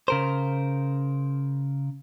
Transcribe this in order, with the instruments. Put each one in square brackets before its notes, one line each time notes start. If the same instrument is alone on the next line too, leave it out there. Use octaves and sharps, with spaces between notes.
[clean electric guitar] C#3 A#4 C5